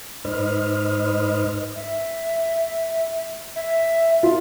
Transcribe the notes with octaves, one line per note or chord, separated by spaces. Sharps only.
G#2 D#4 B4 C5 D#5 F6
E5
E5
F4